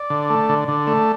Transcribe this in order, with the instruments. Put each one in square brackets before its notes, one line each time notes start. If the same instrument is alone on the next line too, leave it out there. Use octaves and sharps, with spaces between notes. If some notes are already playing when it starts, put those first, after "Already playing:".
Already playing: [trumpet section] D5
[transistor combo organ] D3
A3
D3
D3
A3